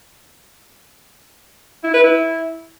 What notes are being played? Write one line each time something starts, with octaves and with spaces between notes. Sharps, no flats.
E4
B4
E4